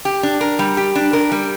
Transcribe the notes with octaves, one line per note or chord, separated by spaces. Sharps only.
G4
D4
A#4
G3
G4
D4
A#4
G3